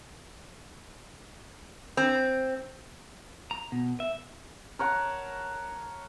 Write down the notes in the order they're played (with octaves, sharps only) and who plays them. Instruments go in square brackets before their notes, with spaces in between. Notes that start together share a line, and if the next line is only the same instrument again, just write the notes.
[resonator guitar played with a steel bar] C4
[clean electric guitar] A#5
B2
E5
[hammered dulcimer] A#4 C#5 F#5 A5